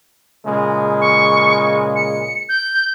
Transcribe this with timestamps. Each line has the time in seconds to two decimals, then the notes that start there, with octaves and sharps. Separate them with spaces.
0.45 A#2 C#3 G#3
1.01 C#6
1.96 C#7
2.49 G6